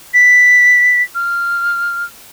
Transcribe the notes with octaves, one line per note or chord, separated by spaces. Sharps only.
B6
F6